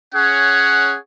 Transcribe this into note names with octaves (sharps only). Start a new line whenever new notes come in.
C#4 G#4 C#5 F#5